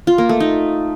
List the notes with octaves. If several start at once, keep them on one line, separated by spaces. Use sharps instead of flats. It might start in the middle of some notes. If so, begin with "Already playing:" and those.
F4
A#3
A3
D#4